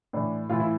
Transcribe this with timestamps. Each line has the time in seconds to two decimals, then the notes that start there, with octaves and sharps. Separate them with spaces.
0.13 A2 E3 D4
0.49 A2 E3 F4
0.60 E4